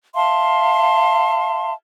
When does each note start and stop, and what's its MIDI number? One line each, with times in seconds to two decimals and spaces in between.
0.15 1.73 76
0.15 1.73 77
0.15 1.73 81
0.15 1.73 84